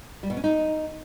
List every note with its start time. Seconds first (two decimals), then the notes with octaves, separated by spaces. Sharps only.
0.23 G3
0.30 B2
0.37 C#4
0.44 D#4